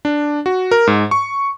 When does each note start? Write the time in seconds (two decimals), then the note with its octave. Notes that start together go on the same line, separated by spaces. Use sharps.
0.05 D4
0.46 F#4
0.71 A#4
0.87 G#2
1.11 C#6